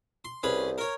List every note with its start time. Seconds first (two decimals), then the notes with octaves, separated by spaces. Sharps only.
0.25 C6
0.43 C2 C#4 G#4 B4
0.78 A#4 C#5